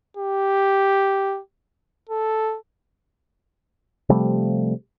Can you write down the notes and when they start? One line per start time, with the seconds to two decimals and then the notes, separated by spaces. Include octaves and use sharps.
0.17 G4
2.09 A4
4.09 C3 F3 G3 A3